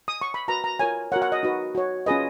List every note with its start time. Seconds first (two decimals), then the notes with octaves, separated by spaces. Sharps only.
0.08 D#6
0.21 C#6
0.34 B5
0.48 F#4 B4 A#5
0.64 A#5
0.79 F4 A#4 C#5 G#5
1.12 F#4 A#4 C#5 F#5
1.22 F#5
1.32 D#5
1.43 D#4 F#4 B4
1.75 F#4 C#5
2.06 C#4 F4 G#4 B4 D#5